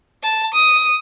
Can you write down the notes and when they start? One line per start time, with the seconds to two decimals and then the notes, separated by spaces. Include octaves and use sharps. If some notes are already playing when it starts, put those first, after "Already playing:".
0.23 A5
0.54 D#6